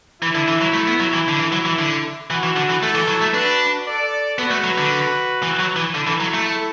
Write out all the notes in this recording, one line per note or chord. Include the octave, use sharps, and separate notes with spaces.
E3 E4
D3
E3
F#3
A3
B3
F#3
E3
D3
E3
F#3
E3
D3
E3 F#4
E3
D3
E3
A3 E4 A4
E3
F#3
A3
D4 F#4 B4
A4 D5
B3 F#4 B4
A3
F#3
D3
E3
F#3
E3
D3 E4 A4
E3
F#3
A3